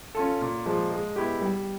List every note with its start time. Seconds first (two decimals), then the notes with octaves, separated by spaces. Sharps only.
0.15 C#4 F4 A4
0.41 A#2
0.66 F3 G#3
0.91 G#3
1.16 B3 E4 G4
1.41 G3